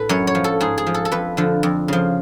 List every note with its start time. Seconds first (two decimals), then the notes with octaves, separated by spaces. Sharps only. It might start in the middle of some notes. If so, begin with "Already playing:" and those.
Already playing: A2 A4 B4
0.09 F#2 C#5
0.27 C#5
0.35 F3
0.44 A4
0.60 G#2 G#4
0.78 G#4
0.87 F3
0.94 A4
1.05 A4
1.12 F2 B4
1.37 D3 F3
1.63 F2
1.88 C#3 F3